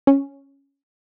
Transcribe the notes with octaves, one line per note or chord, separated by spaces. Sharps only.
C#4